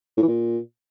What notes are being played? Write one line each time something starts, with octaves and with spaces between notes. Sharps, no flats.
A2
E3
A#2